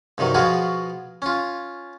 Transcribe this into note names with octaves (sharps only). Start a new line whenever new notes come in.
G2 C3 D#3 F#3
B2 F3 B3 F4 F#4 G#4
C#4 F4